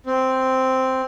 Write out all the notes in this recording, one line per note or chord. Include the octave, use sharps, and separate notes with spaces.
C4